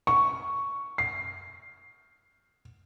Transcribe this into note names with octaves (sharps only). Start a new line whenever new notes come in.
C#6
C7